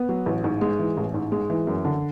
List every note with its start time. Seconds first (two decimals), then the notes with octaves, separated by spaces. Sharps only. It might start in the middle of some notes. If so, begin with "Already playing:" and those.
Already playing: B3
0.09 F#3
0.26 A1
0.44 G#2
0.61 G#3
0.79 E3
0.97 A1
1.14 G#2
1.32 G#3
1.50 E3
1.67 F#2
1.85 D3